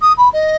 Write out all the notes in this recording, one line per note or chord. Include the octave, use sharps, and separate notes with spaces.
D#6
B5
D#5